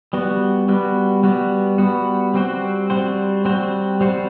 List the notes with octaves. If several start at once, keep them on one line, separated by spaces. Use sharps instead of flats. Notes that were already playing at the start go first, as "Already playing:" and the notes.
G3 B3 F#4
G3 B3 F#4
G3 B3 F#4
G3 B3 F#4
G3 C4 F#4 C5
G3 C4 F#4 C5
G3 C4 F#4 C5
G3 C4 F#4 C5